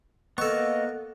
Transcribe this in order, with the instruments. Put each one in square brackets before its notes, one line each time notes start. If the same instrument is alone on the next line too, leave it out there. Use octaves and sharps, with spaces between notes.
[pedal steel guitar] A#3 B3 [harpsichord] A4 C#6 [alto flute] D#5